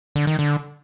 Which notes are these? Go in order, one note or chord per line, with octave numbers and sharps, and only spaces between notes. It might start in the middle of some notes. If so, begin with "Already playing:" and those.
D3
D#3
D3